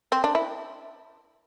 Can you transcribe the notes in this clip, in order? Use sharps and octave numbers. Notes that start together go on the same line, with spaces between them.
C4
D4
E4